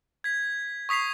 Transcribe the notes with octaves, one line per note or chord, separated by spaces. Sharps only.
G#6 B6
C#6 D#6 B6 C7 F7